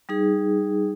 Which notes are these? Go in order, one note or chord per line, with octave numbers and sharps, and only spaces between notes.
G3 D#4 G#4